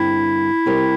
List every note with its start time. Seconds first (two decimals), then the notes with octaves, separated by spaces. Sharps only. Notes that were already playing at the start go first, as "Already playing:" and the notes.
Already playing: G2 D3 G3 C4 E4
0.66 C3 G3 C4 G4 A#4